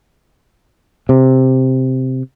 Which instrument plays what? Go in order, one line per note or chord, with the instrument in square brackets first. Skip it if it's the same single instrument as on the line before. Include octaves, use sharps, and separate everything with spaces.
[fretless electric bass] C3